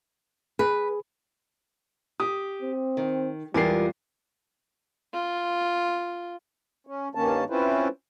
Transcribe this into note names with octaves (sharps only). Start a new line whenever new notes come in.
G#4 B4
G4 D#6
C4
D#3
E2 G3 G#3 F4 G4 A#4 C7
F4
C#4
G2 D#3 A#3 C#4 A5
C4 C#4 E4 F4 B4 C5